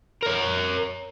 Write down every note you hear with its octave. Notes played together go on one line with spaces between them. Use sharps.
A#4 C#5